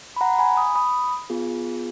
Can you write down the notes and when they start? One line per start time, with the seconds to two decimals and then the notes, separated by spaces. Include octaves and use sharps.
0.16 B5
0.21 F#5 A#5
0.39 G#5 B5
0.57 B5 D#6
0.76 B5 D#6
1.30 B3 F4 G#4